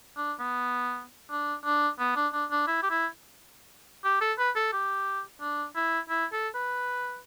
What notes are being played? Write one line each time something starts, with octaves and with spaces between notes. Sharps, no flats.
D4
B3
D4
D4
B3
D4
D4
D4
E4
G4
E4
G4
A4
B4
A4
G4
D4
E4
E4
A4
B4